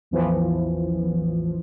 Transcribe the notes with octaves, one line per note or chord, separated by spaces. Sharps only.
A1 E2 E3 F3